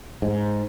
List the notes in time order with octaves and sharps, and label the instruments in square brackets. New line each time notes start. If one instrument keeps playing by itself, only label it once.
[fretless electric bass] G#2